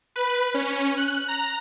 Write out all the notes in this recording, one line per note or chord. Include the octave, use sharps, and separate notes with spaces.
B4
C#4
F#6
A#5